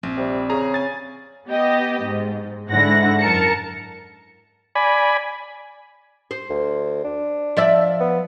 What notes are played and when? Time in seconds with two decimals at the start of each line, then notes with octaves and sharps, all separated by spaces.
0.03 A#1 C4
0.18 C3 G3
0.50 C#3 G#4 A#5
0.74 G#5 A6
1.47 B3 G4 D#5
2.03 G#2
2.71 G#2 D3 E4 F#5 A#6
3.20 F#2 A#4 A5 C#7
4.75 D5 G#5 B5
6.31 C5
6.50 D2
7.04 D4
7.57 F3 D5 E5
8.00 B3